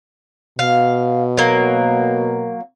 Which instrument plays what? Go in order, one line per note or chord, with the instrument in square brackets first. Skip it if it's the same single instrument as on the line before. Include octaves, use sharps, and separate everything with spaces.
[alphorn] B2 [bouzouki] F5
[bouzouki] F#3 A#3